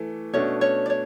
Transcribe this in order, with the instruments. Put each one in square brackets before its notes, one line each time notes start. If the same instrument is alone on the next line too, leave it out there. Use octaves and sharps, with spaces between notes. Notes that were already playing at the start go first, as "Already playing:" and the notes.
Already playing: [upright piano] E3 A3
[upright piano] B2 A3 D4 [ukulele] C#4 C#5
[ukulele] C#4 C#5
D5
C#5